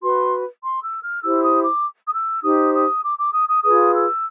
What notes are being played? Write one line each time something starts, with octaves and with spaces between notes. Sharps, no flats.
F#4 B4 C6
C6
E6
F6
E4 G4 C5 E6
D#6
D6
D#6
E6
D#4 G4 C5 D#6
D#6
D6
D6
D#6
D#6
F4 G#4 B4 D#6
E6